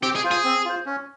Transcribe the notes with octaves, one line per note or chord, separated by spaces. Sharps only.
C4 G4
G#4
F4 C5
G#4
C4
F4 C5
C#4